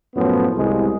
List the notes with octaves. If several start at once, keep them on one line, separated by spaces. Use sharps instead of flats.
F#2 A2 F3 B3
C2 G#3